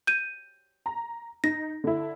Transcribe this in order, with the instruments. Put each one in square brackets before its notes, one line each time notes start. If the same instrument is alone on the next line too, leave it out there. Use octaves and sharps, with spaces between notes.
[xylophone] G6 D#7
[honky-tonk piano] A#5
[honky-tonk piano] D#4 [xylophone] A#6
[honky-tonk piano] D3 E4